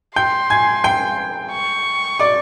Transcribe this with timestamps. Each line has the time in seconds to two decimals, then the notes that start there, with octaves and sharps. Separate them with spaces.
0.16 G5 C6 G6
0.50 G#5 G#6
0.84 G5 G6
1.52 C#6
2.20 D5 D6